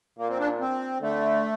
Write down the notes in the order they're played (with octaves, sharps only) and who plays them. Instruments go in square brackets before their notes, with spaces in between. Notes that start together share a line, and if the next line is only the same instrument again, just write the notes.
[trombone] A#2 [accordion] A#3
[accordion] C4
D4
C4
[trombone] D3 [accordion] A3